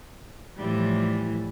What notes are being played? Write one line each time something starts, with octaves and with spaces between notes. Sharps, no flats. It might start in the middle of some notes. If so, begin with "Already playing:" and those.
A2 E3 F3 G3